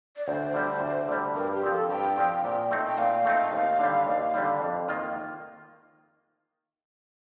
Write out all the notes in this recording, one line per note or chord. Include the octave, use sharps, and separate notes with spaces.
D5
D2 C5
D3 G3
D2
D3 G3
G2 A#4
G4
F3 C4
A4
G2 G5
F3 C4
A#2 G5
A3 C4 D#4
G5
A#2 F5
A3 C4 D#4
D#2
D3 G3
D#2
D3 G3
F2
D#3 A#3 F4